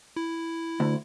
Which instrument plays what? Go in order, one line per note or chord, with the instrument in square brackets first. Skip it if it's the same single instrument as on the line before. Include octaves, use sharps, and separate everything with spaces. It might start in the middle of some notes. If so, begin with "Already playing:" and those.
[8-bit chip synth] E4
[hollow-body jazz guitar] D2